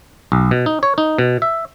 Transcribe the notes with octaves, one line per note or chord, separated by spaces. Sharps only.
B1
B2
D#4
C#5
D#4
B2
E5